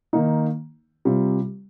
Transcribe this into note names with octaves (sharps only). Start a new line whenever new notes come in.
D#3 A#3 D#4
C3 G3 C4 F4